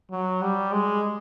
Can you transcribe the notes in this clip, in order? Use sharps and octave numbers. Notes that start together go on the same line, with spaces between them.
F#3
G3
G#3